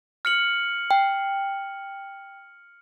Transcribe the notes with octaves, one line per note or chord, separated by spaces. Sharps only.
F6 C#7 F#7
G5